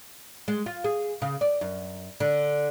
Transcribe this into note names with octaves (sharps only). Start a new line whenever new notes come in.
G#3
F4
G#4
C#3
D5
F#2
D3